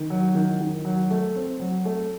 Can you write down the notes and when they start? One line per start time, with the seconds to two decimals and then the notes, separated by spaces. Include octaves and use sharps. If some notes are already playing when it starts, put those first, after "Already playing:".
Already playing: D#3
0.10 F#3
0.35 D#3
0.60 D#3
0.85 F#3
1.11 A3
1.36 C4
1.60 F#3
1.85 A3